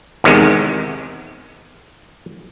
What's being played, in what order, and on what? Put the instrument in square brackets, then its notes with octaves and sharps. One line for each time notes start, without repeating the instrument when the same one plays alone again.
[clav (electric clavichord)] E2 C3 D#3 G#3